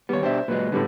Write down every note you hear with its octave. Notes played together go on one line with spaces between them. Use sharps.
D#2 G3 B3 C#5
B2 D4 G4 C5 E5
A#2 F#3 G#3 B4
A2 D3 G3 B3